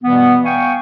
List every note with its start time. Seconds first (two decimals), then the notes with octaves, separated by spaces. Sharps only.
0.02 B2 E3 G3 B3
0.44 F5 G5 G#5 C#6